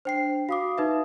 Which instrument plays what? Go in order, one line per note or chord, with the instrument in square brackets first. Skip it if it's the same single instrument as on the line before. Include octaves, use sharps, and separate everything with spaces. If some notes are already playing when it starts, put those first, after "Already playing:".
[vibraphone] D4 [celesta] C5 G5 C7
[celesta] F#4 D6 [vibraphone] F5 D#6
[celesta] D#4 B4 E5